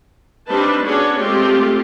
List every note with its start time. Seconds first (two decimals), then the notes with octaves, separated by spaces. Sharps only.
0.48 G3 C4 D4 D#4 B4 A5
0.85 B3 C#4 D4 F#4 G#4 C#5
1.18 G#3 A3 C4 F4 G4